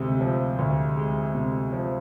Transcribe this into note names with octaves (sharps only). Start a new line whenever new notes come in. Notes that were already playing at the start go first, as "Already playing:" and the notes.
Already playing: D2 C3 G#3
F3
D2
G#3
C3
F3